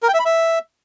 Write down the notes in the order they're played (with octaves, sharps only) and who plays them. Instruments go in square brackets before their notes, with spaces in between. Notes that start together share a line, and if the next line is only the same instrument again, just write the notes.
[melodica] A#4
G5
E5
B5
E5